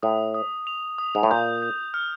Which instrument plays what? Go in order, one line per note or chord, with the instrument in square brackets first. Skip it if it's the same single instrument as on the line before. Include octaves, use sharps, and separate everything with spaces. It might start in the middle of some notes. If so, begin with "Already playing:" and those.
[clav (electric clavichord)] A2 [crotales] D#6
[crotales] D#6
F7
D#6
[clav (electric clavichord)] G#2
A2
[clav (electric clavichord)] A#2 [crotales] G6
[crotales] G6
F6